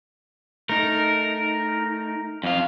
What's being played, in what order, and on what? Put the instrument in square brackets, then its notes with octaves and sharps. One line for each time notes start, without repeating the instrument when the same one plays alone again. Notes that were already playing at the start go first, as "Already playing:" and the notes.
[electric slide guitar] A3 D#4 [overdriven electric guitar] A#4
[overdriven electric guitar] F2 F5